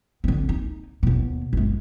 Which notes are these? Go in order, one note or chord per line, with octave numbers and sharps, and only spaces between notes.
D3 C4
D#4
D#2 B2
G1 G#3